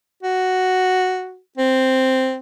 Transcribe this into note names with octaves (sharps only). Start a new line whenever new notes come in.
F#4
C4